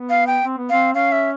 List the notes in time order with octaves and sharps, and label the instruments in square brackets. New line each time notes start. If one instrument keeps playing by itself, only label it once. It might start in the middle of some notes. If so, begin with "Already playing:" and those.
Already playing: [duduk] B3
[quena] F5
G5
[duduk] C4
B3
[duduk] C4 [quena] F5
[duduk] C#4 [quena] F5
[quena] E5